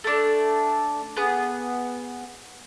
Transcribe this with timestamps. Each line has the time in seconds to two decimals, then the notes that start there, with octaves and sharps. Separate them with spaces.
0.04 A3 D4
1.17 B3 G#4